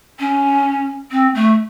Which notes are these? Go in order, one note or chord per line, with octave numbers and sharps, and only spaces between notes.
C#4
C4
A3